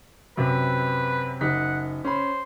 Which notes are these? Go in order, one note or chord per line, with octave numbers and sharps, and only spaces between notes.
F#2 C3 B4
F#1 D#4 F#5 B6
C#4 C5 B5